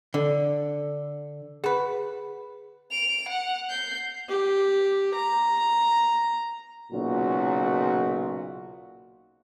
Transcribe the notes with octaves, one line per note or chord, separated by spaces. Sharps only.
D3
F#4 G#4 B4
D7 F7
F#5
G6 C7
G4
A#5
B1 A#2 C#3 F#4